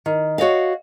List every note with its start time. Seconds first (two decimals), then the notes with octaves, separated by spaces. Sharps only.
0.06 D#3
0.38 F#4 C#5 D#5 F5